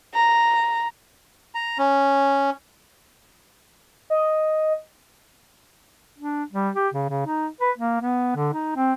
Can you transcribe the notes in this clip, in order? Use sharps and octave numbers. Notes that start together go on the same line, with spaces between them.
A#5
A#5
C#4
D#5
D4
G3
G4
C#3
C#3
D#4
B4
A#3
B3
D3
D#4
C4